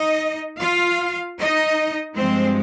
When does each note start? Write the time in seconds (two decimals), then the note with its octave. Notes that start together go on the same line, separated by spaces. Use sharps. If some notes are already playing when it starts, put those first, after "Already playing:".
Already playing: D#4 D#5
0.60 F4 F5
1.38 D#4 D#5
2.16 G2 F3 G#3 C4 C5